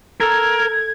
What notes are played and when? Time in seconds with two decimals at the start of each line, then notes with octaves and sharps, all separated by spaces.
0.20 A4 A#4 E6 G#6